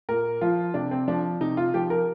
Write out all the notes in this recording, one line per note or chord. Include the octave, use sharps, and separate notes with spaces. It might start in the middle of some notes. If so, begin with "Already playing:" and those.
A#2 A#4
F3 F4
C3 D4
C4
F3 D4
C3 D#4
F4
F3 G4
A#4